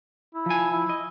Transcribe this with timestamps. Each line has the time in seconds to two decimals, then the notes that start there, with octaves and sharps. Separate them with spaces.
0.35 E4
0.46 F3 G#5
0.71 E4
0.89 D#5